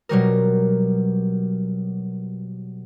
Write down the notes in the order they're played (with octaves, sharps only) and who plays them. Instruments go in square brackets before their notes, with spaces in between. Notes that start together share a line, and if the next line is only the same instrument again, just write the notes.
[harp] B2 F#3 G3 A#4